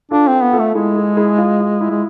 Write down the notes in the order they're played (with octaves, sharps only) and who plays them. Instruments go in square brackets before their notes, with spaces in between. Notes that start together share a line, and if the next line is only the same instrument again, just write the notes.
[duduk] D4 [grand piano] F4 A4
[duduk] C4 [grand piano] F4 A4
[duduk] B3
[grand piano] F4 A4
[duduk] A3
[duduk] G#3 [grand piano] E4 G#4
[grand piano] E4 G#4
E4 G#4
F4
F4
E4
[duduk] G#3